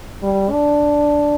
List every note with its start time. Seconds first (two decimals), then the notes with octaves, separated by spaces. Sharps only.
0.23 G3
0.51 D4